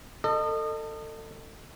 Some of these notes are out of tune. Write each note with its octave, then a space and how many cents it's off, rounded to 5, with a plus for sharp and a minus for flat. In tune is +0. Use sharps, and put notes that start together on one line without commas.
A4 +30 D#5 -25